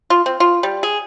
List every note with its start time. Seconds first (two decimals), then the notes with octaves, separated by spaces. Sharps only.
0.10 F4
0.26 C4
0.40 F4
0.63 G3
0.83 G#4